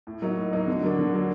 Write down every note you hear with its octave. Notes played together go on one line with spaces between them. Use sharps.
A2
F#3 A#3 D#4
A2
F#3 A#3 D#4
D3
F#3 A#3 D4
D3
F#3 A#3 D4